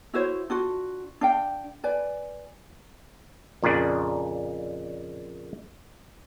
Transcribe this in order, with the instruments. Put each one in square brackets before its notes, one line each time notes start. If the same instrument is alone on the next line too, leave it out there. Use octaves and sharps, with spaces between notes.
[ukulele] E4 F#4 C5 C#5
D4 F4 F#4
D4 F5 G5
B4 D5 G#5
[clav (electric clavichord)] F2 A#2 C#3 D4